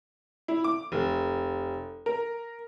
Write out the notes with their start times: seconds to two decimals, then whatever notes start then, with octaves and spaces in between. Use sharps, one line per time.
0.48 E4
0.64 D6
0.92 F1
2.06 A#4